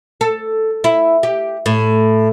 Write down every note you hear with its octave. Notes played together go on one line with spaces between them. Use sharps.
A4
E4
G4
A2